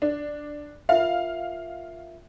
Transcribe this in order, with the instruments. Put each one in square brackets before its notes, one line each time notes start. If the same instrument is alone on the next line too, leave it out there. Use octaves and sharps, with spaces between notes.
[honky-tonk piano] D4
[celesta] F4 A#4 E5 [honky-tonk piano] F5